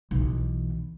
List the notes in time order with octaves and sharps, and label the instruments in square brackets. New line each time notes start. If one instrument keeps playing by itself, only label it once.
[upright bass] B1 E3